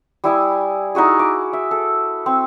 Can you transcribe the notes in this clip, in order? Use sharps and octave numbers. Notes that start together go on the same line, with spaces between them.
G3 E4 G#5 D#6
D#4 E4 F#4 G#4
D6
E5
A4
C4